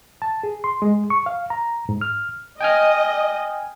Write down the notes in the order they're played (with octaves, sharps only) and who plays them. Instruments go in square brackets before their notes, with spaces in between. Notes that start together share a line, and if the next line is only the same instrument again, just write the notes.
[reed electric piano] A5
G#4
C6
G#3
C#6
F5
A#5
G#2
F6
[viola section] D#5 [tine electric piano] G5 G#5 F6